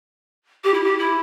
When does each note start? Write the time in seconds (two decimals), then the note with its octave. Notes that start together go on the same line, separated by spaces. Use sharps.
0.64 G4
0.74 E4
0.84 G4
0.99 E4